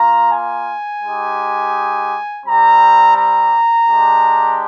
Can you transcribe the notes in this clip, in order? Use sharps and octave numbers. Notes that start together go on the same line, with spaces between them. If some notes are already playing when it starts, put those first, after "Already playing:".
Already playing: A#3 F4 A#5
G#5
G#3 D#4 G4
G3 C4 G4 A#5
A#5
G#3 D4 G4